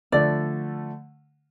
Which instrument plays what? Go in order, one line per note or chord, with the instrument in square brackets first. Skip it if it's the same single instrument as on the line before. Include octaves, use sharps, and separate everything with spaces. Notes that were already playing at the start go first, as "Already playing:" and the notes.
[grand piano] D3 F3 A3 [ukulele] D5